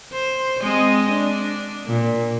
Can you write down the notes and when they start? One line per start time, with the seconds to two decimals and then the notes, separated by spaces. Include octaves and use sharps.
0.13 C5
0.61 G#3 C4 D#5
1.08 D4
1.86 A#2